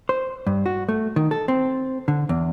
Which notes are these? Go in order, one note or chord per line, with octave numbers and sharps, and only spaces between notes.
C5
G2
F#4
A3
D#3
A4
C4
D3
E2